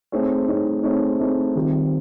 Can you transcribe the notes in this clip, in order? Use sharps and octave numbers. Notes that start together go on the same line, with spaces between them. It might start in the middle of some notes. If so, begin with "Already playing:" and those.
A3 C4 D#4 G#4 C#5
A3 C4 D#4 G#4 C#5
A3 C4 D#4 G#4 C#5
A3 C4 D#4 G#4 C#5
D#3 G3 C4 F4